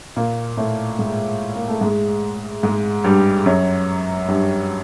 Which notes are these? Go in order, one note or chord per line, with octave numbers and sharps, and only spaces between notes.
A#2 A#3
A2 A3
G#2 G#3
A#3
A3
G#2 G#3
G#2 G#3
G2 G3
F#2 F#3
G2 G3